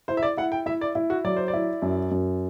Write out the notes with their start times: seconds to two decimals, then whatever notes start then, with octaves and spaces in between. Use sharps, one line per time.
0.08 E4 C5
0.17 E5
0.23 D5
0.37 E4 F#5
0.52 G5
0.66 E4 E5
0.81 D5
0.95 E4
1.10 F#4
1.24 F#3 D5
1.37 C5
1.48 D5
1.54 E4
1.82 F#2
2.11 F#2